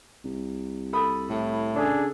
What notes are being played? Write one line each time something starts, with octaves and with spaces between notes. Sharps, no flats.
C2
A4 B5 D#6
A2
C#3 D4 G#4 A4